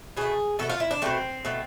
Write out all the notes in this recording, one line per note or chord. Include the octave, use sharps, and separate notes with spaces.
B2 A3 G#4
B2 A3 A4
F4
E4
D4
B2 A3 C4
B2 A3